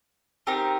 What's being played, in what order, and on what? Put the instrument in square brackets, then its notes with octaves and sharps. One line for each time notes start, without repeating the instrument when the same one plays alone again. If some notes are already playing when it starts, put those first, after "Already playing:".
[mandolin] C4 D#4 G4 A#4